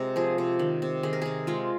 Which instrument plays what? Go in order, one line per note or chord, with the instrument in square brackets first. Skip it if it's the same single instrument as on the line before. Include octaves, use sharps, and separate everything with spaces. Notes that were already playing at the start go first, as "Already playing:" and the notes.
Already playing: [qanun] C3 G#3 A#4
F3 G#4
C3
D#3
C3
D#3 G#4
A#4
C3 G#4
G#3 F4